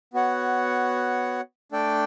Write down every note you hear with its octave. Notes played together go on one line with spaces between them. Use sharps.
B3 F#4 C#5 F#5
A3 D4 A4 D5 G5